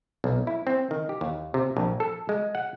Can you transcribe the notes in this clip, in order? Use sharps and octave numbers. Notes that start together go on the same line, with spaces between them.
B1
E4
C4
D#3
G4
D#2
C3
A#1
A4
G#3
F#5